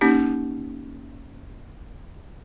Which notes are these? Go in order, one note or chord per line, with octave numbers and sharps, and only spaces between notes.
A#3 C#4 D#4 G4